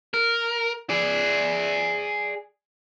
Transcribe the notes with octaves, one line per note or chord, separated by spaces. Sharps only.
A#4
G#4 D5